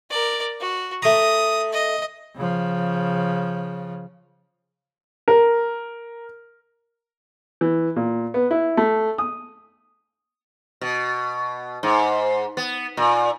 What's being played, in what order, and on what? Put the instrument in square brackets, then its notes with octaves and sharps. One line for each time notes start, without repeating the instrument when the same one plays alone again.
[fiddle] A#4 D5
F#4
[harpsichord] A3 A#5 [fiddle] D#6
[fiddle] D#5
[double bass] C#3 F3
[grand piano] A#4
[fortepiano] E3
A#2
B3
E4
A3
D#6
[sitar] B2
G#2
B3
A#2